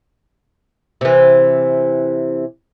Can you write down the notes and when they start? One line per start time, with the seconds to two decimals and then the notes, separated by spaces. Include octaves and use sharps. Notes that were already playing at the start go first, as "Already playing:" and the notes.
1.01 C3 E3